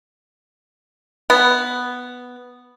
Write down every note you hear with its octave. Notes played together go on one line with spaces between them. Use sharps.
B3